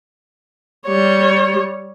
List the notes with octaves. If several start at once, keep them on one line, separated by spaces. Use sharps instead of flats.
G3 C#5